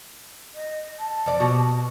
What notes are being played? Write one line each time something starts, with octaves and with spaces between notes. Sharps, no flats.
D#5
A5
F2 D5
B2 F#4 G4